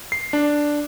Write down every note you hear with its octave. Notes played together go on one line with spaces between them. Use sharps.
C7
D4